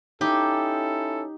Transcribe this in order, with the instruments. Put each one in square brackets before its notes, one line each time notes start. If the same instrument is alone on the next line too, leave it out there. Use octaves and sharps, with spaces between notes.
[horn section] C#4 E4 A4 [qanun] D#4 [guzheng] G4